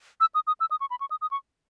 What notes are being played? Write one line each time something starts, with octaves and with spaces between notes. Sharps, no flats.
E6
D#6
D#6
E6
D#6
C#6
B5
C#6
D#6
D#6
C#6